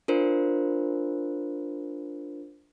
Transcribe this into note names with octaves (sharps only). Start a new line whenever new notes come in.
D4 F4 A#4 C5